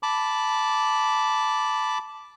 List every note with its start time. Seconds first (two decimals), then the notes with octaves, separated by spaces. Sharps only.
0.03 A5 B5 D6